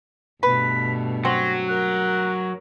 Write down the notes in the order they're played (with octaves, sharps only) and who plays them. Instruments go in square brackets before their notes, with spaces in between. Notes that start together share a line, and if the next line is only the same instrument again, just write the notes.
[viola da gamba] G2 B2 A3 [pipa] B4 [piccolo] B6
[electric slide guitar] F#3 [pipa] C4 [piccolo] A#6
[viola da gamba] A#4 [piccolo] F#6